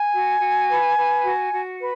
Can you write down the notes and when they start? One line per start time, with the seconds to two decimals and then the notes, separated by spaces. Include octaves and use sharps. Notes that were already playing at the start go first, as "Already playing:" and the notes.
Already playing: G#5
0.14 F#4
0.42 F#4
0.69 B4
0.97 B4
1.25 F#4
1.52 F#4
1.80 B4